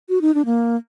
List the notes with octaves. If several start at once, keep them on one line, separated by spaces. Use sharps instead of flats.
F#4
D#4
D4
A#3